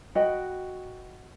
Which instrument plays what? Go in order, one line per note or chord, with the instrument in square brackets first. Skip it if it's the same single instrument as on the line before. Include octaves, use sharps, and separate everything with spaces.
[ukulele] F#4 B4 D#5 G5